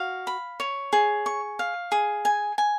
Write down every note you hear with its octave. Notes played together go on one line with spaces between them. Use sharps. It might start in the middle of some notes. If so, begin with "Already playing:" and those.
Already playing: F#4 F5
B5
C#5
G#4
C#6
F5
G#4
G#5
G#5